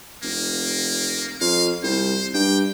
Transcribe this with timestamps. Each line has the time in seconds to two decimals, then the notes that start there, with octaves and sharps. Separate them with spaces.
0.23 F1 A#3
1.41 F2 F5
1.83 C2 C5
2.34 G2 G5